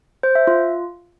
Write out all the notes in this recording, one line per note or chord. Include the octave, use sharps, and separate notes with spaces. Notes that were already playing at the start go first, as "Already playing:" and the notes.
C5
E5
F4